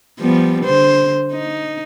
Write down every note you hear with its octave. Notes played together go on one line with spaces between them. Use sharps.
F3 G3 B3
D3 C5
D#4